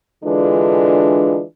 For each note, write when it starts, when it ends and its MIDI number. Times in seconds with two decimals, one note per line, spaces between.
0.24 1.42 50
0.24 1.42 52
0.24 1.42 56
0.24 1.42 62
0.24 1.42 65